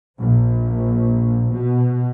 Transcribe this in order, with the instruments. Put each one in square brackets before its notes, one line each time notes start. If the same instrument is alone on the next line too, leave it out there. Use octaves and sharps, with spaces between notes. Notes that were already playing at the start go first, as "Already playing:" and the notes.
[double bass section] A#1
B2